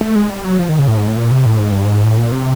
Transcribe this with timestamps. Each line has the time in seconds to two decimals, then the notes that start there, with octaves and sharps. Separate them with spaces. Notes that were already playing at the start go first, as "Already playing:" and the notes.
0.01 A3
0.16 G#3
0.30 G3
0.44 F#3
0.59 F3
0.69 D#3
0.79 C#3
0.88 A2
0.97 G#2
1.07 A2
1.16 A#2
1.31 C3
1.46 A2
1.59 G#2
1.72 G2
1.85 G#2
2.04 A2
2.18 A#2
2.32 C3